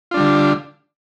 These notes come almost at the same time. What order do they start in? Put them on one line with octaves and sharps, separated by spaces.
F4 D4 G3 D3